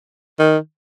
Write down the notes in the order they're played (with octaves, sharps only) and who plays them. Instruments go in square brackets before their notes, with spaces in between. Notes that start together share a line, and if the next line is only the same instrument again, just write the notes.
[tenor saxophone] D#3